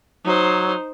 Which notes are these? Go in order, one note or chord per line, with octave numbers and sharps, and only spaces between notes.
F#3 D#4 C5